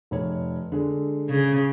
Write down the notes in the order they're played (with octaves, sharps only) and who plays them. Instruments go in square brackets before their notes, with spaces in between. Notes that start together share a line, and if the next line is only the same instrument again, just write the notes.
[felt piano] F1 C#5
D3 G#3
[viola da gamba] C#3